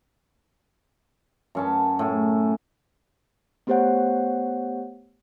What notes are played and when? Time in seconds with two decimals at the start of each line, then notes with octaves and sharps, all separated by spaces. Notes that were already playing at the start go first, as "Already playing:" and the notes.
1.55 F#2 C#4 A5
1.99 A2
3.67 A3 B3 G4 C5 C#5 F#5